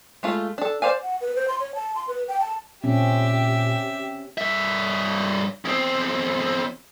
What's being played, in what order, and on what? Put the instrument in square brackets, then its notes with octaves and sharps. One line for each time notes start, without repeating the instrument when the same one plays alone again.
[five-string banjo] G#3 A3 F4
D4 A4
C5 D5 F5 G#5
[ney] F#5
B4
C5
C6
C#5
A5
C6
B4
G5
A5
[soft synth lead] A#2 [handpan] C4 C#4 [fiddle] G4 E5
[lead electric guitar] G2 E5
E2 C4